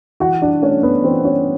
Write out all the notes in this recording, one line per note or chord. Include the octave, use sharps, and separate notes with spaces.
E3 F#4 F#5
D4 D5
A3 C#4 C#5
B3 B4
E3 C4 C5
C#4 C#5